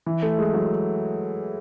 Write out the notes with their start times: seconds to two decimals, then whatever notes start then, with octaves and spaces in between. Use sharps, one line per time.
0.06 E3
0.22 A3
0.39 G#3
0.54 F#3